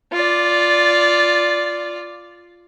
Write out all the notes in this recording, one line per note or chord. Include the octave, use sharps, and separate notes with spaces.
F4 D5